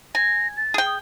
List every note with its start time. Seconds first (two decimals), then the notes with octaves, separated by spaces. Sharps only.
0.15 G#5 A#6
0.57 A6
0.74 G#4 G5
0.86 D#6